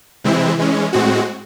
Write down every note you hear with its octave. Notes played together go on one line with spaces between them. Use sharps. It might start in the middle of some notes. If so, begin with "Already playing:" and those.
C3 E3 G#3 C4 E4
E3 G#3 C#4
A2 G#3 C4 F#4